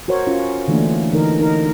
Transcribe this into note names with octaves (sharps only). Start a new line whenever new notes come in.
F#4 A#4 C5 C#5
C#4 F4
D3 E3 A3 A#3 D4
D3 E3 D#4 A#4
D#4 A#4